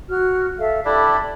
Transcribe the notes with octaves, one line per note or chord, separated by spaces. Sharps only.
F#4 F6
A4 E5 F5
D4 E4 G4 A4 D5 B5